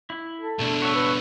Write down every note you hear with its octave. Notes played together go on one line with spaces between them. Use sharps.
E4
A4
B2 A3 D4
F#4 C#5 E5
B4